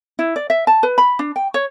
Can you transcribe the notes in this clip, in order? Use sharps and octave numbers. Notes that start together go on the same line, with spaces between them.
E4
D5
E5
A5
B4
B5
D4
G5
C#5